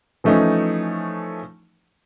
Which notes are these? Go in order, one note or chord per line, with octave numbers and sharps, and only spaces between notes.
E3 F3 A3 C#4 D#4